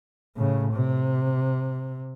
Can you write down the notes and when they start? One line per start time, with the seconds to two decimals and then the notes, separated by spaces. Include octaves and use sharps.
0.37 A2 C#3
0.73 C3